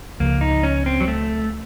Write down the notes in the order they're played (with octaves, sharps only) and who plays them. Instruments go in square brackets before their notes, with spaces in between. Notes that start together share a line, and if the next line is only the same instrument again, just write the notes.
[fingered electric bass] C#2 C#3 F3 [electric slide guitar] A#3
[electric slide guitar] D#4
C#4
C4
F#3
A3